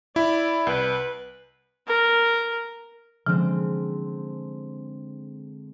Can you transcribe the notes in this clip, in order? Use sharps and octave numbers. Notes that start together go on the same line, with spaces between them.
E4 D5
C2 B4
A#4
D3 F3 G#3 C4